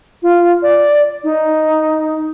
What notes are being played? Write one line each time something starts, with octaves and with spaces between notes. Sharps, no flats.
F4
D5
D#4